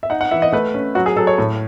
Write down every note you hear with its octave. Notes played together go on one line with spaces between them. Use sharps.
E5
D#4 F#5
F#5
E3 E5
D#5
A3 B4
C#4
F#3 F#4
G#4
F#3 A4
C#5
A2